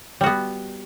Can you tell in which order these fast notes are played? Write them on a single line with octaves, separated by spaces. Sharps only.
G3 F#4 B3